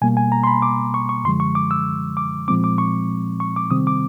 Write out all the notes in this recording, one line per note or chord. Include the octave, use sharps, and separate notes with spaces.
B2 G3 A#3 G#5
G#5
A#5
C6
B5
D6
C#6
C#6
F#2 D3 F3 G#3 C6
C#6
D6
E6
D6
A#2 F3 G#3 C4 D6
D6
C#6
C#6
D6
C3 D#3 G3 C4 D#6
D6